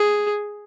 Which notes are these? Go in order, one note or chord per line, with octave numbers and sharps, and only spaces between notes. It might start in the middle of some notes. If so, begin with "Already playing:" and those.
Already playing: G#4